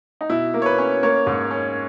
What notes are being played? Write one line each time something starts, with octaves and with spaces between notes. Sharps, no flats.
D#4
B2 E4
A#3
C#5
B4
C#4
A#3 C#5
G#2
C#4